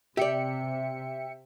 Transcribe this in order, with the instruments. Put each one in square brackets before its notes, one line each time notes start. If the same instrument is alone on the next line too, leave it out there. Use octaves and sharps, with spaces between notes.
[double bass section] C3 [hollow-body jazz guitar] G4 D5 [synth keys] E5 G5 C#7